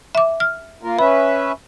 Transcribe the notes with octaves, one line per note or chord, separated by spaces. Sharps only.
E5 D6
F6
A#3 F4 A#4
C#4 B4 E5 B5